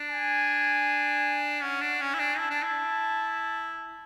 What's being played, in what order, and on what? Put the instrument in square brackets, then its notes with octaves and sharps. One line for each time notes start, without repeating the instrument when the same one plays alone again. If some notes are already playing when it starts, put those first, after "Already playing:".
Already playing: [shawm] D4
[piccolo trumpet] G#5
[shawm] C#4 [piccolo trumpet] F#5
[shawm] D4
[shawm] C#4 [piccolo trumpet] G#5
[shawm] E4
D4
[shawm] E4 [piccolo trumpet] A5
[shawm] D4
E4